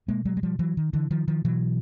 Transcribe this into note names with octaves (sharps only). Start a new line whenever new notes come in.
B2 G#3 A#3
F#3 G#3
G#3
F3 G3
E3 F#3
D#3
D3 E3
D#3 F3
D#3 F3
B2 E3 F#3